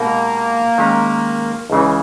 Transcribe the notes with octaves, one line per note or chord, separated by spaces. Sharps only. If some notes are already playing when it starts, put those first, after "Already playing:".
Already playing: B2 G#3 A#3 D#4 G4
D#3 G#3 C#4
C#2 C#3 E3